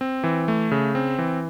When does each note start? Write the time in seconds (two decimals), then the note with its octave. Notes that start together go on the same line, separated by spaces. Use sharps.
0.01 C4
0.24 E3
0.48 A3
0.71 C#3
0.95 C4
1.18 E3